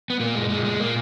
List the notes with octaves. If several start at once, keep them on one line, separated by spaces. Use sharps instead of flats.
B3
A#2 A#3
G#3
A#2 G#3
G#3
A#2 A#3